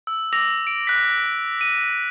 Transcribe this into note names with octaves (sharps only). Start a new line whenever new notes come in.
E6
D6 E6 A#6 F7
D7
F#6 B6
D#7